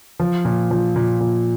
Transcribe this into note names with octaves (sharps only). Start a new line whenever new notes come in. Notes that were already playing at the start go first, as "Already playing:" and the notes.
F3
A#2
F3
A#2
A#2